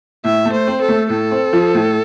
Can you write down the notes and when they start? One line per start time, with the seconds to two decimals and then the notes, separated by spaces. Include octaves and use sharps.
0.24 A2 E5
0.45 A3
0.53 C5
0.67 C4
0.81 A4
0.89 A3
1.09 A2 A4
1.31 C4
1.53 F3
1.74 A2